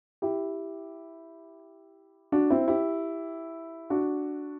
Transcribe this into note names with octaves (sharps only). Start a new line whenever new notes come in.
E4 G4
D4 F#4
C4 E4
E4 G4
D4 F#4